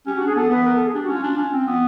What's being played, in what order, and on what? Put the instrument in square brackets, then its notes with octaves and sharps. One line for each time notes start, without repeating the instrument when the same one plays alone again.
[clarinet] C#4 [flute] G4
[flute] F#4
[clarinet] D4
[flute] G#4
[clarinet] B3 [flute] A4
[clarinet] B3 [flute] B4
[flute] A#4
A4
G#4
[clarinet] D4 [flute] G4
[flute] F#4
[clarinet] C#4 [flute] F4
[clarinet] D4
C#4
C4
B3